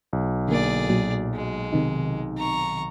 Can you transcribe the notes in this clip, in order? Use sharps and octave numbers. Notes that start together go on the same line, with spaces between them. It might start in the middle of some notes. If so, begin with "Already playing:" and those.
B1
D3 A#3 G#4 D5
A#2 F#3
G#3
C3 D#3 D#4
A#5 C#6